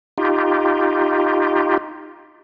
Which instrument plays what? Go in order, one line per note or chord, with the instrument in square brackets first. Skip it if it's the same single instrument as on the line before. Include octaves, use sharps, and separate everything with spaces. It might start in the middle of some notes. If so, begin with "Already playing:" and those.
[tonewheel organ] D#4 F4 G4